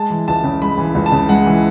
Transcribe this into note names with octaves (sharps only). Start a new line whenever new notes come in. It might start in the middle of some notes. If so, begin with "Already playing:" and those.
Already playing: G#3 A5
E3
C#2 A5
C#3
G#3 B5
E3
B5
C#2
A5
C#3
G#3 F#5
E3